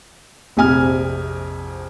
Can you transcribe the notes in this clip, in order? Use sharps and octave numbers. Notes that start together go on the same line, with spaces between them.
A#1 F2 C3 G#5 F6